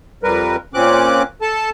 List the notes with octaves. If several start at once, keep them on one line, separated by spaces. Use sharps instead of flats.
F2 G3 A#4 B4
A#2 C4 C#4 D6 F#6
A4 A5